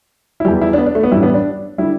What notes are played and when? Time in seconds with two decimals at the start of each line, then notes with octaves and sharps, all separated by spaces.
0.40 E4
0.45 E2 E3 G3 G4
0.61 E4
0.73 D4
0.78 B3
0.86 D4
0.95 A3
1.03 B3
1.11 A1 G2 G3 E4
1.23 B3
1.34 D4
1.78 D3 G3 E4